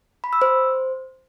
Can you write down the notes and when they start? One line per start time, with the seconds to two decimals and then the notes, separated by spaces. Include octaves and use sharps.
0.24 B5
0.33 E6
0.42 C5